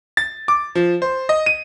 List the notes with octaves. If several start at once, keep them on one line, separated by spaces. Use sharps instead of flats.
A6
D6
F3
C5
D#5
D#7